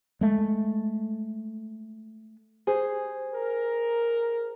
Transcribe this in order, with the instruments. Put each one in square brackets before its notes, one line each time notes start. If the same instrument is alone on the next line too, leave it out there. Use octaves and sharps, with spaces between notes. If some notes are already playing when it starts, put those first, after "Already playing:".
[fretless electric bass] G#3 A3
[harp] G#4 C5
[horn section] A#4